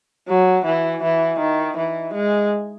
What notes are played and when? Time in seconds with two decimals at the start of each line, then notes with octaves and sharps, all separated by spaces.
0.28 F#3
0.65 E3
1.03 E3
1.40 D#3
1.78 E3
2.14 G#3